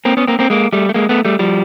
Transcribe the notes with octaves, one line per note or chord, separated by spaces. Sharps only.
A#3 C4
B3 C#4
A#3 C4
A#3 C4
G#3 A#3
G3 A3
A3
G#3 A#3
A3 B3
G3 A3
F3 G3